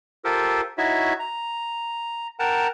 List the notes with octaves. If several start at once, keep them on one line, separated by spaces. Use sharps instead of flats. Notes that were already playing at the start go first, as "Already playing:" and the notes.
F4 G4 A4 A#4 C5
D#4 E4 F#4 C#5 E5
A#5
A#4 F#5 G5 A5 A#5